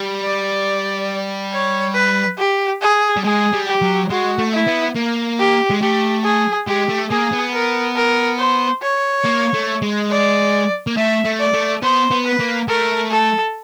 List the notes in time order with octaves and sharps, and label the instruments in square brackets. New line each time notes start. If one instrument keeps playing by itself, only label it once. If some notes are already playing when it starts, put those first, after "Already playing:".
Already playing: [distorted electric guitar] G3
[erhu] D5
C#5
B4
G4
G#4
[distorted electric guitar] G3
[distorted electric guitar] G#3 [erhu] G#4
[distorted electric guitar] G3
[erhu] G4
[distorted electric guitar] F#3
[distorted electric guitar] G#3 [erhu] F#4
[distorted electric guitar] A3
[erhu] E4
[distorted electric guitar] B3
A#3
[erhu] G4
[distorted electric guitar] G#3
[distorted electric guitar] A3 [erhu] G4
[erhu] G#4
[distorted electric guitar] G#3 [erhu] G4
[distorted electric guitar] A3
[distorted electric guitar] A#3 [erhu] G#4
[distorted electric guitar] B3
[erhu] A#4
A#4
C5
C#5
[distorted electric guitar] A#3
A3
G#3
[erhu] D5
[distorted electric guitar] A#3
[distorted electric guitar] A3 [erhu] E5
[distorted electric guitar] A3
[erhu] D5
[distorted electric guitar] A3
[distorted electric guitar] B3 [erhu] C5
[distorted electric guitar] B3
[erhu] B4
[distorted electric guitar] A#3
[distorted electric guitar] A3 [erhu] A#4
[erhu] A4